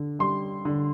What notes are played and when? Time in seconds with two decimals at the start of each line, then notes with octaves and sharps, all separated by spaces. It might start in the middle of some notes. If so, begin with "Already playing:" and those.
Already playing: D3
0.19 G3 C6
0.65 D3